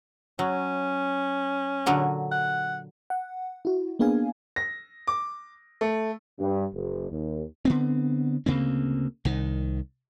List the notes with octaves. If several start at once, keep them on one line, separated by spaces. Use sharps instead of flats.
F#3 C#4
A#2 D3 F#3
F#5
F#5
E4 F#4
A#3 B3 D4 G#4 F5 G#5
A#6
D6
A3
G2
F#1
D#2
D3 B3 C4
D2 C#3 A#3 C4
C2 D#3